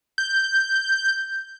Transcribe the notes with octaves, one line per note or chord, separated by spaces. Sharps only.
G6